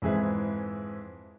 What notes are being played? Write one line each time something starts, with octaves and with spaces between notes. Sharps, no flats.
F2 G#2 E3 G#4 E5